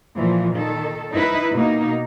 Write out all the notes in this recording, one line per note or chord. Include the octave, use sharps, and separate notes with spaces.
A#2 E3 F3
D#3 A4
D#4 E4 B4
B2 A#3 D#4